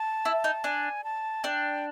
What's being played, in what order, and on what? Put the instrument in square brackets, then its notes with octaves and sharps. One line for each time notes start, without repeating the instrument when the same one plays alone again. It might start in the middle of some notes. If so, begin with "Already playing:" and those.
Already playing: [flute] A5
[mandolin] E4
D#4
[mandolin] D4 [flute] G#5
[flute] A5
[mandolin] D4 [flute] G5